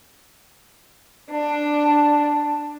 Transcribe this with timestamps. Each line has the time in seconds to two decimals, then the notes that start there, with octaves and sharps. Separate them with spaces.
1.30 D4